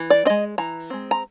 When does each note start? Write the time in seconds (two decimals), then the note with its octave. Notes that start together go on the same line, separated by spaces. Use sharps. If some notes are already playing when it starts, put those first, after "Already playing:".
Already playing: E3
0.10 D5
0.25 G#3 C4 D#5
0.58 E3 A#5
0.90 G#3 C4
1.11 A#5